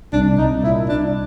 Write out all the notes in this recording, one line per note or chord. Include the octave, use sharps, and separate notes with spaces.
C2 D4
C2 D#4
A#2 E4
C2 D4